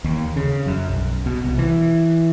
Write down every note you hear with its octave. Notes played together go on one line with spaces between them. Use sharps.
D#2
C#3
F#2
B1
B2
C2
E3